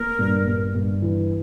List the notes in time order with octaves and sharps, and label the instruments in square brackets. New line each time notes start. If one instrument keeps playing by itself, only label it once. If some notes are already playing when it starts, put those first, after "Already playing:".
Already playing: [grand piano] A#3 [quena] A#4
[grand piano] G2
G2
G2
E3